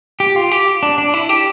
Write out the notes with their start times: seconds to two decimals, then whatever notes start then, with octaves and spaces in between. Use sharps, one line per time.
0.20 G4
0.36 F4
0.52 G4
0.83 D4
0.98 D4
1.14 E4
1.29 G4